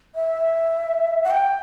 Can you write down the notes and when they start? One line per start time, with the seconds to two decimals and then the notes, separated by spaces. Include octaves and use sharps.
0.15 E5
1.24 F#5
1.31 G5